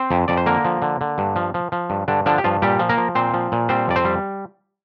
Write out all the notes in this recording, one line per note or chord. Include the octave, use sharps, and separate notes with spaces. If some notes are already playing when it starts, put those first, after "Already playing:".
Already playing: C4 C5
F2
F2 D5
C5
D3 A#3 A#4
F3
D3
D3
G2
F3
F3
F3
G2
G2 D3 D4
D3 F3 D4
G4
G2 F3 F4
A#2 G3 G4
F3
A#3 A#4
F3
A#2 C4 C5
F3
A#2
G3 C4 C5
F2 D5
C4 C5
G3